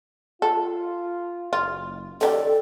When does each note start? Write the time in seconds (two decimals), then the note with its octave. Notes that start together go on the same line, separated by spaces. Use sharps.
0.42 F4 A4
1.53 F#1 F4
2.21 D#3 C#4 D#4 G4 A4 D5